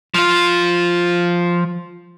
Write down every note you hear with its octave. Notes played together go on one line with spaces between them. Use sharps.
F3 F4